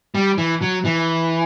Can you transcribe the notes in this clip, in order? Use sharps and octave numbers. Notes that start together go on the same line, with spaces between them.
G3
E3
F#3
E3